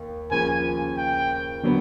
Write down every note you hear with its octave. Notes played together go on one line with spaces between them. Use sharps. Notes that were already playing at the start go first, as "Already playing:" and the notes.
Already playing: D#2
D#2 C#3 F3 G#5
G5
D3 F#3 B3